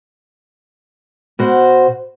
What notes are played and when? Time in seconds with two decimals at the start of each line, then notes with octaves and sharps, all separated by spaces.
1.39 B2 F#4 C5